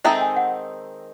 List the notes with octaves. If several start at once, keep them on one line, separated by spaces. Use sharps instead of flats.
D#3 G#3 C4 D#4 A4 E5
G#5
F#5